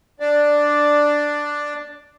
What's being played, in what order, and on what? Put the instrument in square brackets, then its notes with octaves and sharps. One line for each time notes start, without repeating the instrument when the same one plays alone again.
[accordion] D4 D5